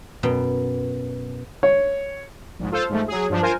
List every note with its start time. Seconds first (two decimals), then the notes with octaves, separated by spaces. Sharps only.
0.23 F#2 B2 G5
1.63 C#5
2.59 A#1 G#2
2.71 F4 A4 C5 F5
2.89 G#2 F3 A3
3.08 F#3 G#4
3.29 G2 F3 D4
3.42 F4 A#4 C5 G#5